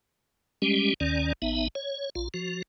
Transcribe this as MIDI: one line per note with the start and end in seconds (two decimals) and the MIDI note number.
0.62 0.94 55
0.62 0.94 56
0.62 0.94 61
0.62 0.94 67
1.00 1.33 39
1.00 1.33 51
1.00 1.33 61
1.00 1.33 74
1.42 1.68 33
1.42 1.68 59
1.42 1.68 63
1.42 1.68 76
1.75 2.10 73
2.15 2.28 34
2.15 2.28 65
2.34 2.62 53
2.34 2.62 66